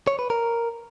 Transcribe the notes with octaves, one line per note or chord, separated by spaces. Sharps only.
C#5
B4
A#4